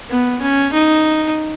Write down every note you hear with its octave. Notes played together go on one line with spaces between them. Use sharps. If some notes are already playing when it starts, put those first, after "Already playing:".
B3
C#4
D#4